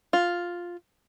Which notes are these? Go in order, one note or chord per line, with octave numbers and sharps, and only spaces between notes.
F4